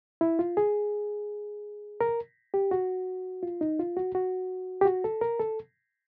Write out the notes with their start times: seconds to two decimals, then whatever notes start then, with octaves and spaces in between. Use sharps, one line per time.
0.21 E4
0.39 F4
0.57 G#4
2.01 A#4
2.54 G4
2.71 F#4
3.43 F4
3.61 D#4
3.79 F4
3.97 F#4
4.15 F#4
4.81 G4
4.85 F#4
5.04 A4
5.21 A#4
5.40 A4